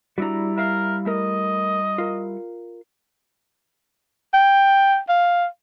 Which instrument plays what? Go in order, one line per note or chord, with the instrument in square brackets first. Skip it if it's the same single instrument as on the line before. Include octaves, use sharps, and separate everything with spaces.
[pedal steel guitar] G3 E4 A#5 [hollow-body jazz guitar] D4 F#4
[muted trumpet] A#4 [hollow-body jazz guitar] E5 F5
[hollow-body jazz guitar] A3 A#4 [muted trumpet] D#5
[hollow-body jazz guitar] F4 A#4
[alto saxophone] G5
F5